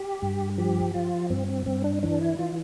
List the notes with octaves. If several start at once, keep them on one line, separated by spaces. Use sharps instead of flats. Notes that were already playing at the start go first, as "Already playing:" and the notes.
Already playing: G4
G2
F3 G4
F3 F4
G2 C4
C4
G2 C4
D4
E3 D4
E4
E3 F4